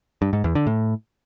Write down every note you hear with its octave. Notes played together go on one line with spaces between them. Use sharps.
G2
G#2
E2
D3
A2